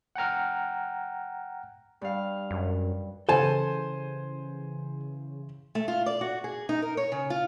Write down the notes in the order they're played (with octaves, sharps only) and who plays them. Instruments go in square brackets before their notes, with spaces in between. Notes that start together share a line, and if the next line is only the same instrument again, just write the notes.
[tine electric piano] F#5 G5 A#5 F6
[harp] G2 F5
[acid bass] F#2
[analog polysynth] C#3 E3 [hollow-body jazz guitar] A4 A5 [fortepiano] C5 G#5
[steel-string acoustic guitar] A3
F4
D5
F#4
G#4
D#4
A#4
C#5
C#3
F4